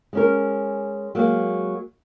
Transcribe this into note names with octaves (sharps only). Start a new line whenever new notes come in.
G#3 C#4 A#4
F#3 G#3 A#3